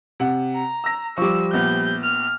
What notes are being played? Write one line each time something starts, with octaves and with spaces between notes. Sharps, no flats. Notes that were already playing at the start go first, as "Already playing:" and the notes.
C3 F#5
A#5
E6 A#6
F3 G3 C#6 D6 E6
A#1 B3 G6
F6